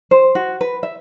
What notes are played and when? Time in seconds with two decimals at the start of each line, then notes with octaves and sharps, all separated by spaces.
0.11 C5
0.35 F#4
0.61 B4
0.83 E5